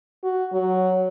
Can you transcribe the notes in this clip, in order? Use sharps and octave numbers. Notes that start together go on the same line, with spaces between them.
F#4
F#3